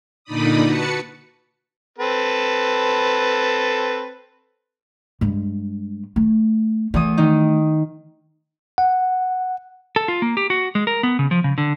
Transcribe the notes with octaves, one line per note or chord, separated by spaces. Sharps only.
A#2 D3 D#4 D5 B5 D#6
F#4 B4 A5 C#7
C4 A4 B4
G2 G#3
A3
E2 E3 A3 D#6
D#3 D#4
F#5
A4
F4
A#3
G4
F#4
G#3
A#4
B3
C#3
F3
C#3
D3